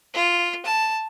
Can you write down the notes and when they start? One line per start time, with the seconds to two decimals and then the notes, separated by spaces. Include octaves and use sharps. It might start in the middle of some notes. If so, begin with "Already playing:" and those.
0.14 F4
0.65 A5